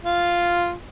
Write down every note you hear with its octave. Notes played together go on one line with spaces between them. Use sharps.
F4